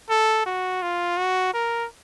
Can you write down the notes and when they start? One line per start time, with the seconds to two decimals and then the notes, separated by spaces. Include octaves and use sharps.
0.10 A4
0.46 F#4
0.82 F4
1.18 F#4
1.54 A#4